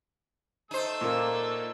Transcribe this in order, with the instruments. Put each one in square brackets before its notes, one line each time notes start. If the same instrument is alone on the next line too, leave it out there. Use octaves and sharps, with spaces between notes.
[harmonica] A3 A4 E6 [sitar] D#4 C5
[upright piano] A#2 A#3